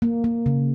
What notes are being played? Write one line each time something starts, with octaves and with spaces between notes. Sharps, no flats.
A#3
A#3
C#3